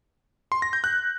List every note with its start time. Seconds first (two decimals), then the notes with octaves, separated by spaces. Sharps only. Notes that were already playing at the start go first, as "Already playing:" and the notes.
0.52 C6
0.62 A#6
0.73 G6
0.84 F#6